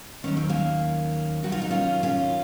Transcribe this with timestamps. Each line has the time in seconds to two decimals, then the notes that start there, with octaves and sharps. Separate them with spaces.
0.24 D#2 D#3 F#3 C#4
0.37 C4
0.49 A#3 C#4
1.43 F#2 D#3 F#3 F#4
1.52 F4
1.62 D#4
1.71 C#4 F4
2.03 C#4 F4